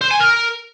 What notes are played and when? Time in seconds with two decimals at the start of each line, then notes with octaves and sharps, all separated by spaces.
0.01 C5
0.11 G#5
0.20 A#4